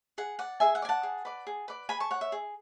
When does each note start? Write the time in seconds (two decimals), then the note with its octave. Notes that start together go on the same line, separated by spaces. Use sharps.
0.18 G#4 F#5
0.39 D5 F#5
0.60 G#4 E5 G#5
0.75 F#5
0.82 D5 G#5
0.89 F#5 A5
1.03 G#4
1.25 B4 D5
1.47 G#4
1.68 B4 D5
1.89 G#4 G#5 B5
2.00 A5 C#6
2.11 C#5 F#5
2.21 E5
2.32 G#4